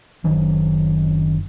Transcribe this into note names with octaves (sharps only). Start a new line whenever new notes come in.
F#1 D#3 F#3